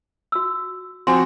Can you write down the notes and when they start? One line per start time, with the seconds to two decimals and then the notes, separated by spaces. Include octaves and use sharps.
0.32 F#4 E6
1.07 F3 C4 F#4 G#5 C6